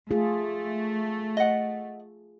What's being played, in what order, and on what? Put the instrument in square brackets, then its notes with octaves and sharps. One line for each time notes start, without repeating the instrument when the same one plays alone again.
[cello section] A3 [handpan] F4 G#4
[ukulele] D#5 F#5